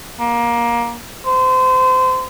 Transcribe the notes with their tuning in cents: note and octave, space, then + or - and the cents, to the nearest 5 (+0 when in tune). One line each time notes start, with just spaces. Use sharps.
A#3 +20
C5 -30